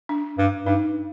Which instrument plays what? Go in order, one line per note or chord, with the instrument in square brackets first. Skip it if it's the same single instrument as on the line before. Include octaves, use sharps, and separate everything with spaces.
[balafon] D4
[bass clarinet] G2
[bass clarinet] G2 [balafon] D#4